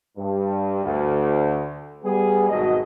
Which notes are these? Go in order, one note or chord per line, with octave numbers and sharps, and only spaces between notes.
G2
D2
G3 B3 G#4
G#1 B2 F#3 D#5